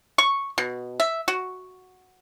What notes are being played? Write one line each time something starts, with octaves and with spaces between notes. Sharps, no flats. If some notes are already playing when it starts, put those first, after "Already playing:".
C#6
B2
E5
F#4